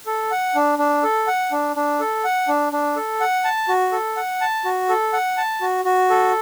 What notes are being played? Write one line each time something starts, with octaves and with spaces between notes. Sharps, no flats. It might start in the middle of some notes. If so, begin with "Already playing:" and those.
A4
F#5
D4
D4
A4
F#5
D4
D4
A4
F#5
D4
D4
A4
F#5
A5
F#4
A4
F#5
A5
F#4
A4
F#5
A5
F#4
F#4
A4